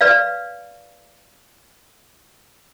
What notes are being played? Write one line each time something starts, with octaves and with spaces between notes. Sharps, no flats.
B4 D5 F5